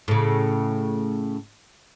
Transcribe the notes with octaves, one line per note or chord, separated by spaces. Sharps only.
A2 C#3